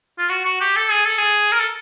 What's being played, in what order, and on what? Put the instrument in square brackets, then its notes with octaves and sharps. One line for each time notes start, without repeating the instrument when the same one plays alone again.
[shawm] F4
F#4
F#4
G4
A4
G#4
A4
G#4
A#4
A4